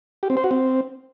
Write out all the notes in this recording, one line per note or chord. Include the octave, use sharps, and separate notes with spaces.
G4
C4
C5
F#4
C4